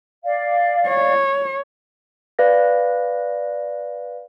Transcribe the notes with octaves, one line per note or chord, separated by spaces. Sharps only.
D5 F5
C#5
B4 D5 F5 A#6